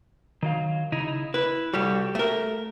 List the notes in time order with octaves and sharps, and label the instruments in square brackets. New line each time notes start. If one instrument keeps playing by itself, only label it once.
[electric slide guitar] D#3 F#3 F5
C#3 D#4 E4
[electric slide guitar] E4 [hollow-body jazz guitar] B4
[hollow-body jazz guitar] C2 G3 [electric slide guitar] F#4 G4 A4
[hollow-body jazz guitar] A3 A#4